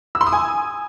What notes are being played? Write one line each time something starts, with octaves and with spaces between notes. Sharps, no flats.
E6
C6
D#6
G#5